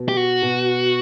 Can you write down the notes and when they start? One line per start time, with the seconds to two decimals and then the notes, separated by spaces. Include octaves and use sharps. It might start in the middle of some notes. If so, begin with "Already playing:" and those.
Already playing: B2
0.09 G4
0.17 F#4
0.42 B2